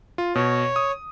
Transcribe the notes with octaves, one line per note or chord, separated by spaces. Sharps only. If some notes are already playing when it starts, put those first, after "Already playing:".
F4
B2 C#5
D#6